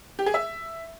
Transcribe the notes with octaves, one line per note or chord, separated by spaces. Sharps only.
G4
G#4
E5